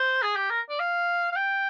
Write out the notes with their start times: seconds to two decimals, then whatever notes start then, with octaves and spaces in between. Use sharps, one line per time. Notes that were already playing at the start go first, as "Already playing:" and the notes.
Already playing: C5
0.22 G#4
0.36 G4
0.50 A#4
0.69 D5
0.79 F5
1.32 F5
1.36 G5